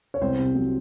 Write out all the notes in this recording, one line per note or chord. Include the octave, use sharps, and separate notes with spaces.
C#5
C2 C4 C5
C3
F#3